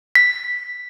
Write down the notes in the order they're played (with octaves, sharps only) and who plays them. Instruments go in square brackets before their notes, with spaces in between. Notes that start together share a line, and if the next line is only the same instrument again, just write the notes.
[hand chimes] B6